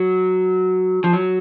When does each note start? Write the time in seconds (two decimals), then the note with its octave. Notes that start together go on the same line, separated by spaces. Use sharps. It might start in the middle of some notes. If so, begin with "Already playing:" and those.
Already playing: F#3
1.04 F3
1.13 F#3